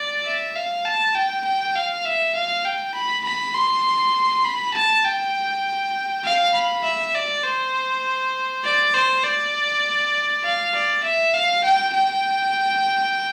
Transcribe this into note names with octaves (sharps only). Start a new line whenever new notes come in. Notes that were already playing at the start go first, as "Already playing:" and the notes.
Already playing: D5
E5
F5
A5
G5
G5
F5
E5
F5
G5
B5
B5
C6
B5
A5
G5
F5
B5
E5
D5
C5
D5
C5
D5
F5
D5
E5
F5
G5
G5